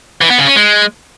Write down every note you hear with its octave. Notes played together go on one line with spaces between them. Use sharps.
E3
B3
C#3
C#4
G#3